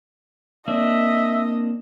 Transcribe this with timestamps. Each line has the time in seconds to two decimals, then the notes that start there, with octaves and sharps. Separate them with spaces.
0.68 A#3 C4 D4 D#5 E5